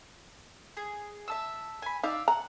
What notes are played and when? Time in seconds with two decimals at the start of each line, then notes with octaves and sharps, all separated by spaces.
0.77 G#4
1.28 E5 A5 E6
1.82 G#5 B5
2.03 D#4 D5 E5 F5
2.28 F#5 A#5